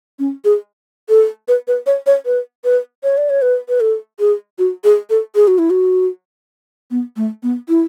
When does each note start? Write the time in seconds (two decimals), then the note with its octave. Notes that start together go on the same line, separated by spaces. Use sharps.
0.19 C#4
0.45 G#4
1.09 A4
1.48 B4
1.68 B4
1.86 C#5
2.07 C#5
2.26 B4
2.64 B4
3.03 C#5
3.17 D5
3.30 C#5
3.42 B4
3.69 B4
3.80 A4
4.20 G#4
4.59 F#4
4.84 G#4
5.10 A4
5.35 G#4
5.48 F#4
5.59 E4
5.70 F#4
6.91 B3
7.16 A3
7.43 B3
7.69 E4